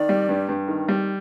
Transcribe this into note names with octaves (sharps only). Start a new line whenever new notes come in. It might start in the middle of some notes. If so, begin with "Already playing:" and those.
Already playing: D#3 D5
G3
G2
G2
D#3
G3